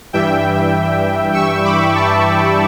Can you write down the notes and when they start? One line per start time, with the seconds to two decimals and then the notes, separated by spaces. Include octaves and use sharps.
0.13 G2 E3 G3 E5 G5
1.34 C#6 E6
1.65 B5 D6
1.95 A5 C#6